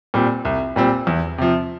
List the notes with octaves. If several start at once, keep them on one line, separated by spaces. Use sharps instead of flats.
A#2 G3 C4
C2
A#2 G3 C4
E2
C3 F3